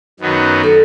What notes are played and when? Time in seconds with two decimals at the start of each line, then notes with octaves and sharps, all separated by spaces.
0.20 F#2 D#3 F#3 B3
0.64 A4